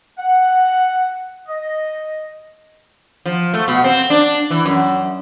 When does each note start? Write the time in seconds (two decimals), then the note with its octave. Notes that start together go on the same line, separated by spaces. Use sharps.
0.19 F#5
1.48 D#5
3.26 F3
3.54 A3
3.68 B2
3.84 C4
4.10 D4
4.51 E3
4.66 F#2